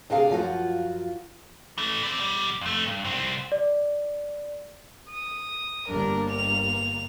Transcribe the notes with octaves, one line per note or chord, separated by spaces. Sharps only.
D2 C3 D4 G#4 F5
F#2 F3 F4 F#4
E3 A3
C4 D5
B2 G3
F2 A3
G2
C2 C4
D5
D#6
G1 G3 A#3 D4 A#4
F7